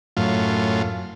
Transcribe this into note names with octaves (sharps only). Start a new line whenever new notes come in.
F#2 A2 F4